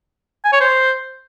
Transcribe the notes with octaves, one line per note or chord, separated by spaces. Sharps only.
G#5
C#5
C5